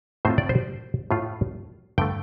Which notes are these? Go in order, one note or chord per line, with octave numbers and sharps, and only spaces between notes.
A2 A3 C4 F4 C5
D5
C5
A2 A3 F4
G2 D3 A3 G5